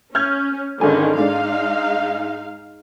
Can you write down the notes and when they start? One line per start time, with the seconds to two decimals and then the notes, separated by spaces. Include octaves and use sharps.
0.15 C#4 F6 G6 G#6
0.81 G#1 D3 D#3 G#3 C#4 G#5
1.18 G#2 G#3 D4 D#4 F5